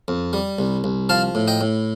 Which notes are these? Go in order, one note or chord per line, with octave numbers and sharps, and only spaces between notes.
F2
G3
C2
C2
F3 F5 A5
A2
D#5 G5
A2